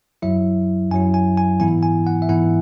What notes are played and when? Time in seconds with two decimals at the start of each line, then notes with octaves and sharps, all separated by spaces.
0.22 F#2 F#3 E4 E5
0.91 F#2 G#5
0.94 F#3 E4
1.14 G#5
1.38 G#5
1.60 G#2 E3 B3 E4 G#5
1.83 G#5
2.07 F#5
2.22 E5
2.29 G#2 E3 B3 E4 F#5